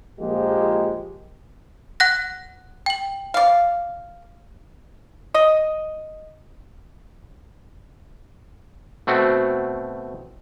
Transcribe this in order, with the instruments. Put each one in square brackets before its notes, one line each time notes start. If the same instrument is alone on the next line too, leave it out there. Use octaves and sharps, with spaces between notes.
[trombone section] A#1 F3 G#3 A#3 G4
[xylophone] F#5 F#6 A#6
G5 F#7
[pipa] D5 F5
D#5
[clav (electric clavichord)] B2 A3 C4 F#4